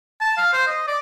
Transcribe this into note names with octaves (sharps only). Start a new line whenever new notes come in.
A5
F5
C5
D#5
D5